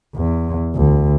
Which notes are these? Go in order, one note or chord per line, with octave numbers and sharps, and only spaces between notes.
E2
D2